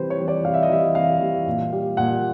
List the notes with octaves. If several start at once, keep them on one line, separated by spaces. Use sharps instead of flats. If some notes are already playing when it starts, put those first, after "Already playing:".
Already playing: C3 E3 G3 B4 C5
C#5
E3 G3
D5
C3 F5
E5
D#5
E3 G3 E5
C3 F5
E3 G3
A#2
G3
A#2 F#5